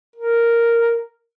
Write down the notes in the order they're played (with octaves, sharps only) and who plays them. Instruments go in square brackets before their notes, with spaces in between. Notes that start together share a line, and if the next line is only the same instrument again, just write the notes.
[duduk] A#4